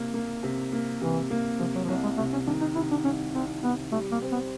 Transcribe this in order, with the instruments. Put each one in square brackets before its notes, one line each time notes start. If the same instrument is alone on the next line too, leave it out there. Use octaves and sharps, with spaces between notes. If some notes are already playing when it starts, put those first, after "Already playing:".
Already playing: [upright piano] C3 A#3
A#3
C3
A#3
[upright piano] C3 [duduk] E3
[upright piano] A#3
[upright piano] C3 [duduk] F3
[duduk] F#3
F3
[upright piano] C2 [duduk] F#3
[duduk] G#3
[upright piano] C3 [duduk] A3
[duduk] C#4
[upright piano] D#3 [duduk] D4
[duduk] D#4
[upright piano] C3 [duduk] E4
[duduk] D4
[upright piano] C2 [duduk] C#4
[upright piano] C2 [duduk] C4
[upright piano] C3 [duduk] B3
[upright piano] G3 [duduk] A3
[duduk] A#3
[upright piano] C4
[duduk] B3